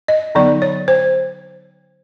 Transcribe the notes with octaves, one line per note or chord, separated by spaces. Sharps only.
D#5
D3 F#3 B3 D#4 D5
C#5
C5